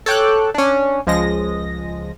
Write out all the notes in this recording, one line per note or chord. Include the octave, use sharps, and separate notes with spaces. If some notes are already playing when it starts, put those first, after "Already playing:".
A4 C#5 G5 D6 F#6
C#4 D4
C#2 F3 G#3 D#5 A#6